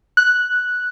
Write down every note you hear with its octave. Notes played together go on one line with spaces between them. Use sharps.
F#6